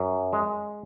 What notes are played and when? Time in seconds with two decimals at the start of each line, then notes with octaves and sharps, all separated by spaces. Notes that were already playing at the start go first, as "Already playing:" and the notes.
Already playing: F#2
0.33 G#3